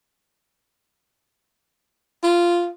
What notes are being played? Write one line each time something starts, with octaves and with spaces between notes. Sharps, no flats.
F4